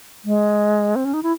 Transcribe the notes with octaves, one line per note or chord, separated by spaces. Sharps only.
G#3
C4
C#4
D#4
E4